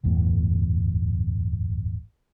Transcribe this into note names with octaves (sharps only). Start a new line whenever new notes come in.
D1 G1 E2 A2